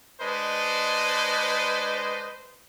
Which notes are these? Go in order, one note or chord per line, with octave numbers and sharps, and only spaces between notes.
G#3 D4 B4 C5 D#5